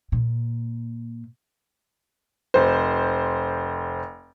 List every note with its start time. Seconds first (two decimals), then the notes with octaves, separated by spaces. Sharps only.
0.12 A#2
2.54 F1 C5